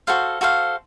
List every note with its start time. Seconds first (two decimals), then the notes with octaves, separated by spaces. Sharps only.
0.07 F#4 A4 C5 F5
0.41 F#4 A4 C5 F5